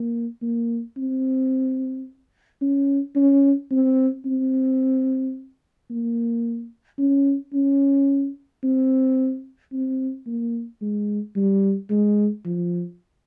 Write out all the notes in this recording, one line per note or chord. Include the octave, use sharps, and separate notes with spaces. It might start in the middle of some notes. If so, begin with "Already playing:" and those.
Already playing: A#3
A#3
C4
C#4
C#4
C4
C4
A#3
C#4
C#4
C4
C4
A#3
G#3
G3
G#3
F3